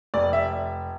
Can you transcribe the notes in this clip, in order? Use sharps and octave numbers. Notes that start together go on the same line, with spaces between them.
F1 D5
E5